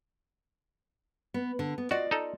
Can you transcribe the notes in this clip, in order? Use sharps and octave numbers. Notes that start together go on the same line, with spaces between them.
B3
D3
B3
F4 F#4 D5 D#5
D#4 A4